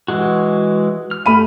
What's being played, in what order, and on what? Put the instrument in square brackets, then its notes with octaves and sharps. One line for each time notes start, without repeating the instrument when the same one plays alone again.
[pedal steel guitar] E3 G#3 F#4
F6
[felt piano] A3 B5 D#7